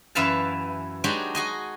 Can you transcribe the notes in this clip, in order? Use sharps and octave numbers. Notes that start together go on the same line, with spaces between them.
F#2 E3 B4 E5 F5 A5
F#3 G#3 D4 D#4 F#4 G4
F#4 G#4 D#5